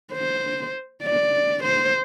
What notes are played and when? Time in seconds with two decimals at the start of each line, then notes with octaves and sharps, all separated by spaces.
0.13 C5
1.03 D5
1.63 C5